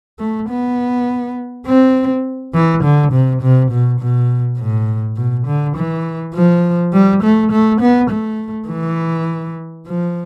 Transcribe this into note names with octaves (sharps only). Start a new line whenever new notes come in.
A3
B3
C4
E3
D3
C3
C3
B2
B2
A2
B2
D3
E3
F3
G3
A3
A3
B3
A3
E3
F3